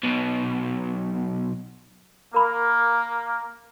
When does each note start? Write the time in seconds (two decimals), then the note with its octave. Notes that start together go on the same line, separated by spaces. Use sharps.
0.03 B1 B2
2.34 A#3 A#4 B5